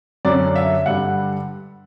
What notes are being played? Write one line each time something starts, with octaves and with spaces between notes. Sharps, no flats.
F#2 D3 F#3 C#4 D5
E5
G2 D3 G3 F#5